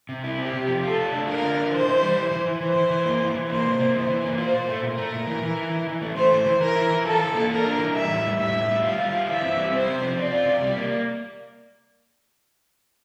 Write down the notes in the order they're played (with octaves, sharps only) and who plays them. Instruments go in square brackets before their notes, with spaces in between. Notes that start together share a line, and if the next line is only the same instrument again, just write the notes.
[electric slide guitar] C3
E4
[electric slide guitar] C4 [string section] G4
[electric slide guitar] C3
F3
[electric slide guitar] F4 [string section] A4
[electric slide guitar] A3
D4
[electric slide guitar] F4 [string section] A#4
[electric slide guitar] D3
D4
[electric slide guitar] E3 [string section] C5
[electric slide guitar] E3
G3
E3
E3
E3
[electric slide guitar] E3 [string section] C5
[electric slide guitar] E3
E3
A#3
E3
E3
[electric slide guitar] A#3 [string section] C5
[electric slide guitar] C3
A#3
[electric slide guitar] E3 [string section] C5
[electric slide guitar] E3
A#3
[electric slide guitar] F4 [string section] C5
[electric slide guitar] A#2
A3
[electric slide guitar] A#2 [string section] A#4
[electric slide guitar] A3
A#2
E3
E3
E4
E3
E3
A3
[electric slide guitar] A3 [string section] C5
[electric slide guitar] E3
E3
[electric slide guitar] E3 [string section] A#4
[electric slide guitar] E4
E3
[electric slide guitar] F4 [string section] A4
[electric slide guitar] E3
A#3
[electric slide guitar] F4 [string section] A#4
[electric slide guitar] D4
E3
[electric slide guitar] G3 [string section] E5
[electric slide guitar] A2
G3
[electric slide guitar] A2 [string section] E5
[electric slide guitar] A2
G3
[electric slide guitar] F4 [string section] F5
[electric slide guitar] G3
F4
[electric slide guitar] E3 [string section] E5
[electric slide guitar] C4
G3
[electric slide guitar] C4 [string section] C5
[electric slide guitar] C3
F3
[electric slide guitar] C4 [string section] D5
[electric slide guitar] F4
C3
G3
A#3